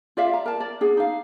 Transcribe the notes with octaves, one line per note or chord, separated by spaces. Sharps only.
F4 D5 E5 F5
A#5
A#4 A5
D5
D4 G#4 F#5
D#4 F5